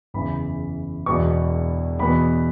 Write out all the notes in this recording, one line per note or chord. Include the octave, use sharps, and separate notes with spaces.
F#1 E2 C#3 E3 B5
E1 E2 B2 C#6
E2 B2 B3 B5